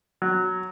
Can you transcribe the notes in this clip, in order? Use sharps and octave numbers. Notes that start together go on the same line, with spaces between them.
F#3